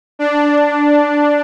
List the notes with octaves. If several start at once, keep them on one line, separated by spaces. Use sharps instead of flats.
D4